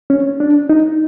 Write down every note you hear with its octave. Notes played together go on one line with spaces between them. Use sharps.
C#4
D4
D#4